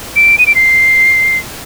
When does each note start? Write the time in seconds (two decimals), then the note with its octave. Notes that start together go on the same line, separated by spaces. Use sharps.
0.16 D7
0.38 D#7
0.47 D7
0.55 C7